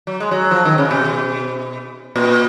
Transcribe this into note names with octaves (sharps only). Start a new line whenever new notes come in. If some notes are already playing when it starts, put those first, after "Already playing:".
F#3
G#3
F#3
F3
D#3
C#3
B2
A#2